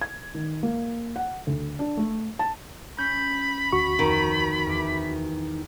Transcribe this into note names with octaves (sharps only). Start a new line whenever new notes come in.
G#6
D#3
A#3
F#5
D2
D4
A3
A5
C#4 B5 G6
D2 F#4 C#6
F2 D#3 B3
E2 D6